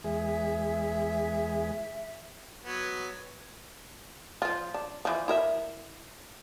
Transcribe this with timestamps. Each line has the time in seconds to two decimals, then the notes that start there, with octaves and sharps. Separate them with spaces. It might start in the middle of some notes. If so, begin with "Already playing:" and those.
0.04 E2 G#3 G#4 E5
2.64 F#3 B3
4.42 F3 F4
4.74 D4
5.05 E3 F3
5.28 E4 A#4 E5